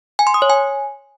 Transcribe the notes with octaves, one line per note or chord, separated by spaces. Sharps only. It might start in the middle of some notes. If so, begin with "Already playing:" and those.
G#5
C6
D#6
C#5
G#5